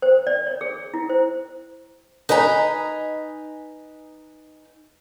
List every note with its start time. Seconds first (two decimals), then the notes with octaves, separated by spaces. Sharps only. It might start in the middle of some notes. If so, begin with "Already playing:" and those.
0.02 C5
0.27 D5
0.47 C#5
0.61 G#4
0.94 E4
1.09 C5
2.29 D#4 B4 D#5 G#5 A#5